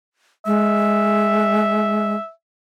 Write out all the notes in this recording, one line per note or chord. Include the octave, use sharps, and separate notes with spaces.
G#3 E5